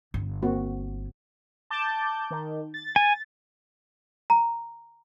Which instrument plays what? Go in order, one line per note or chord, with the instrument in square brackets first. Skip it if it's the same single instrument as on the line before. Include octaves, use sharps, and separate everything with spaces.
[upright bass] G1
[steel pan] A#3 C4 F#4
[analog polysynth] A5 D6 G6
D#3
A6
[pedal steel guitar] G#5
[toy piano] A#5